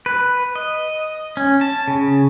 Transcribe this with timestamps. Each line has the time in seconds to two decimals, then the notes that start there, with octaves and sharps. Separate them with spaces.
0.06 B4
0.55 D#5
1.37 C#4
1.61 A5
1.88 C#3